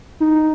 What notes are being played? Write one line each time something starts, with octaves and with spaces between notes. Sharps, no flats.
D#4